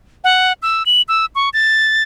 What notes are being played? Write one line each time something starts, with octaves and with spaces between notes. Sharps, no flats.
F#5
E6
F#7
E6
C#6
A6